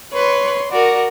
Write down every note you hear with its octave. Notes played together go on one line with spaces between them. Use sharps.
B4 C#5 C6
F#4 A#4 D5